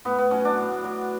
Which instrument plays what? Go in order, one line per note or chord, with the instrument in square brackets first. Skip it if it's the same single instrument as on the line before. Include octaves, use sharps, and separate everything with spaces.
[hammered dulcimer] A2 B3
B3
F#3 C#4
D4
A2
F#3